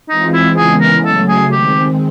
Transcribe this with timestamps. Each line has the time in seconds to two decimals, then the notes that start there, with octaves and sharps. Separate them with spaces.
0.09 E3 G#3 C4 D#4 F4
0.33 E4
0.57 C#3 E3 G#3 B3 G#4
0.80 A#4
1.04 C#3 F#3 A3 A4
1.28 G#4
1.51 D#3 G#3 C4 G4